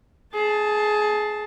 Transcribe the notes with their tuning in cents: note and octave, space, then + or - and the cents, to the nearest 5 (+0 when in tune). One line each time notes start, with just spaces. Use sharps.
G#4 +20 A5 -5